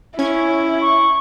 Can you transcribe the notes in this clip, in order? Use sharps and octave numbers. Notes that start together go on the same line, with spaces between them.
C#4 E4 G#6
C#6